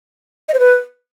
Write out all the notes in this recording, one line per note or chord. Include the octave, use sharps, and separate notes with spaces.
D#5
C5
B4